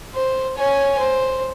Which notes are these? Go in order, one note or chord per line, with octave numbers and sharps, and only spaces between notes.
C5
C#5 G#5
C5